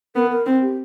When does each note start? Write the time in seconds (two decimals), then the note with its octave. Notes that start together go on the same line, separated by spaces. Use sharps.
0.15 B3 A#4
0.31 A#4
0.46 C4
0.62 G4